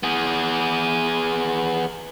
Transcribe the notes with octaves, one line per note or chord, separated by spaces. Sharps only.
B3 G#4